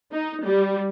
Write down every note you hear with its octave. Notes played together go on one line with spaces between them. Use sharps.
D#4
G3